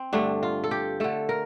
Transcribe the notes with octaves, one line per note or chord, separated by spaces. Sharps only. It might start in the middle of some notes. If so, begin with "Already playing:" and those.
Already playing: C4
G2 D3 A3 D4
F4
A4
G4
D3 A3 A4
A#4